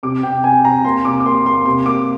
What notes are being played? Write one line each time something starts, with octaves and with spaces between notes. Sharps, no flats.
C3 D6
C3 G5
C3 G#5
C3 A#5
A#3 C6
C3 D6
D6
A#3 C6
A#3 C6
C3 C6
A#3 D6